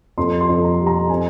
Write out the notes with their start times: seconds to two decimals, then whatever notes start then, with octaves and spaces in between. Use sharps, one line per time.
0.18 F2 C6
0.41 C6
0.48 F2
0.64 A#5
0.79 G3
0.87 A#5
1.09 C4 G#5